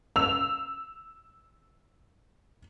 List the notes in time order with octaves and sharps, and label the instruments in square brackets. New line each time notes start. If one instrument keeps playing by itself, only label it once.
[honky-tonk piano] E6 F7